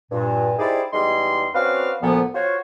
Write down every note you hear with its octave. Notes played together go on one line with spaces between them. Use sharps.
G2 A#2
D#4 E4 G4 G#4 C5 D5
E2 G3 G#3 D#4 C6
C4 C#4 F#4 B4 D5 F5
D2 A#2 F3 B3
F4 F#4 C5 C#5